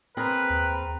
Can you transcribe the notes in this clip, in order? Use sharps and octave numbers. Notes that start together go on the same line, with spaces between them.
C4 G#4 A#4 B4 G5 A#5
D#2